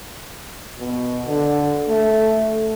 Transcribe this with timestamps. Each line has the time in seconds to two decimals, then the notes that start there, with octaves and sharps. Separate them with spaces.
0.79 B2
1.26 D3
1.88 A3